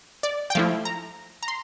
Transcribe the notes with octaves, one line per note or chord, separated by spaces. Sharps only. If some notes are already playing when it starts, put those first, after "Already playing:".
D5
G5
F3 A3 E4 F5
A#5
A#5
C6